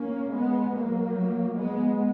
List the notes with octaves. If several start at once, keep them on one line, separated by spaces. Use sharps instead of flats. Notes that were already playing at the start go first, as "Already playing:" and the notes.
Already playing: A#3 C#4
G#3 B3
F#3 A#3
G#3 B3